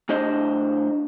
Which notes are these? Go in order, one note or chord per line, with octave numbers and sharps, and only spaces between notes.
A2 D4 C5 D#5